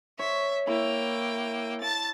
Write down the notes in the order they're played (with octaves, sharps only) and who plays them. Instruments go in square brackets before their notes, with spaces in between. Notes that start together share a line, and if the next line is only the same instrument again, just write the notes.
[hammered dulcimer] C#5 [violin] E5
[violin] A#3 G5 [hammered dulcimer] E4
[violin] A5 A6